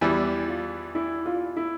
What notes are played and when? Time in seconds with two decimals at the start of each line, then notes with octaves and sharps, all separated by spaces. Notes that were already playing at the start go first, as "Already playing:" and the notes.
0.01 E2 E3 G3 E4
0.48 F4
0.95 E4
1.26 F4
1.57 E4